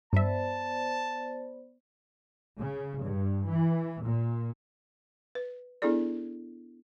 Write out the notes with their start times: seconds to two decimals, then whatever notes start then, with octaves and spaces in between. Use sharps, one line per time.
0.13 G2 B3 C5 D5 E5 A5
2.57 C#3
3.00 G2
3.47 E3
4.02 A#2
5.35 B4
5.82 B3 D4 E4 G#4 A4 D5